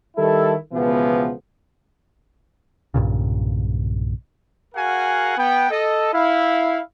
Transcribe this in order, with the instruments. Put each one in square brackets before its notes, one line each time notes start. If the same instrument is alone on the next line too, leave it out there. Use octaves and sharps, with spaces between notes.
[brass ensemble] D#3 G3 E4 A4
C#2 B2 E3 F3 B3
[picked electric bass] B1 G2 A#2 C#3
[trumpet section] F#4 G#4 A#4 F5 F#5 G#5
B3 G5
A4 D#5
E4 F5